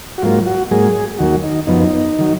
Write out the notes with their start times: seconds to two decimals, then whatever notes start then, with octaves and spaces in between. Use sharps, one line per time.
0.18 F#4
0.22 G#2 F#3 A#3 F4
0.46 F#4
0.71 G#2 F#3 A#3 G#4
1.19 D#2 D#3 F#3 A#3 F#4
1.44 D#4
1.67 F#2 F3 B3 D#4
2.19 D#3 F#3